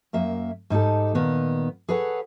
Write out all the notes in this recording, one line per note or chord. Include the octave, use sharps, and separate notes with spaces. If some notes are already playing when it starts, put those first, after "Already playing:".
F#2 A#3 E5
G#2 D#4 G4 A4
A#2 D#3 B3
G#4 A4 B4 C#5 F#5